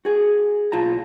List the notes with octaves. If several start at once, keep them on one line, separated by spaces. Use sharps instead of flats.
F#4 G#4
B1 F4 A5 A#5